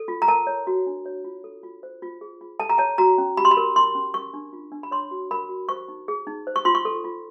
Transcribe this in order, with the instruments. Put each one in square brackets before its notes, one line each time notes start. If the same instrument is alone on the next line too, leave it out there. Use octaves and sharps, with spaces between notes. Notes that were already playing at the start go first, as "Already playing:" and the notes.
Already playing: [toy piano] A4
F4
A#5
A#4 A5
C#5
F#4
D4
C#5
F4
A4
F4
C5
F4
G#4
F4
A4 A5
A#5
C#5 A5
F#4 A#5
C#4
G4 B5
C6
B5
A#4
E4 C6
C#4
A#4 C#6
D4
F4
D4
B5
C#5 C6
F#4
A#4 B5
F#4
C5 C#6
D#4
G#4
D#4
C5
C#6
F4 C6
C#6
A4
F4